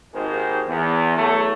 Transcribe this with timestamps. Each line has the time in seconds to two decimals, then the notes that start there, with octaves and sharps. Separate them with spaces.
0.14 G#1 D#2 D#3 G#3 C5
0.66 E2
1.17 E2 F#3 A3